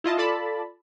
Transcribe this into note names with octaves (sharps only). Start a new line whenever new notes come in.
E4 F4 D#5 A5
F4 A4 D5 A5 B5